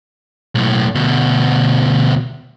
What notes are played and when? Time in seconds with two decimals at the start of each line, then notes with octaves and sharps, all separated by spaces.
0.55 B1 A2
0.95 D2 B2